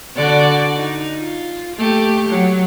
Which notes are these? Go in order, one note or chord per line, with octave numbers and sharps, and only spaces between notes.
D3 F#4 D5
D#4
F4
A3 G4
F#3